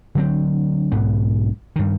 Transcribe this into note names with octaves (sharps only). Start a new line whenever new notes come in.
D3 F#3 C4
B1 G#2 B3
G2 D#3